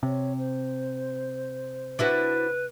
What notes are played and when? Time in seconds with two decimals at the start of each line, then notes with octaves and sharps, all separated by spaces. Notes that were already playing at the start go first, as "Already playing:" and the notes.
0.03 C3 C#5
0.38 C5
1.99 D4 E4 F#4 B4